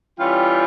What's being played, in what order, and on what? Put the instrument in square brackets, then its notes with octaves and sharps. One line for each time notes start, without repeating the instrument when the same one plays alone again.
[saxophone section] E3 G3 C#4 F4 [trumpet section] G5